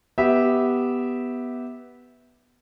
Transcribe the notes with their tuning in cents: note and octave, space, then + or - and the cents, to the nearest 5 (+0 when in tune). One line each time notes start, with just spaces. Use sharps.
B3 +0 G4 +0 E5 -15